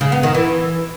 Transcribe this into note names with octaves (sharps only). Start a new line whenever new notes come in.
C#3
B3
D#3
E3